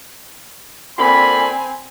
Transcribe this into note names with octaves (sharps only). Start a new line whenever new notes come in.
A#2 D3 C4 G#5 B5